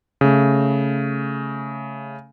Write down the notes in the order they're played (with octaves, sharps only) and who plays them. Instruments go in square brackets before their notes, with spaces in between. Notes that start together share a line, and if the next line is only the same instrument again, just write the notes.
[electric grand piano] C#3 A3